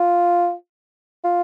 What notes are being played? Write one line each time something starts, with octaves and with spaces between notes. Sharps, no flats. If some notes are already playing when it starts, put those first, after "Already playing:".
Already playing: F4
F4